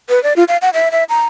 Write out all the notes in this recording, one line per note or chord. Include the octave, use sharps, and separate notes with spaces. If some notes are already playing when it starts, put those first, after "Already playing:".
B4
D5
F4
F5
F#5
E5
E5
A#5